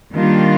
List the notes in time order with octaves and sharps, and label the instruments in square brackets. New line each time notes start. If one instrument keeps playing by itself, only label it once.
[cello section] D#3 G3 A#3 D4 F4